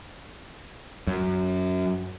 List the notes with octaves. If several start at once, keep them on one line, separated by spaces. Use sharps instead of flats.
F#2